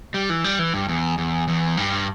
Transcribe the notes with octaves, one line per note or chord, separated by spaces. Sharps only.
G3
E3
G3
E3
G2
E2
E2
E2
G2